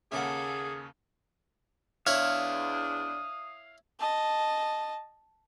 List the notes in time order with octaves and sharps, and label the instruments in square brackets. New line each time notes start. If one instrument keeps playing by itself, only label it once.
[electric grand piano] D#2 C#3 C#4 [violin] A#3 A4 [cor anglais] G#4 [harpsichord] E5 F#5
[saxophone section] E2 D4 [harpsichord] E4 C#5 [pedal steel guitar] F5 [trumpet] D#6
[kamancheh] D#5 A5